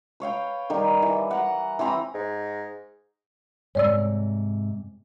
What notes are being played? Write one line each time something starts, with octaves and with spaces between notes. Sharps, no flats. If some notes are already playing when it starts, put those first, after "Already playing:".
B4 C#5 F5 G5
D#3 G3 D#4
E3
F#5 A#5
E3 C4 A#5 B5
G#2
G#2 C3 C#5 D5 E6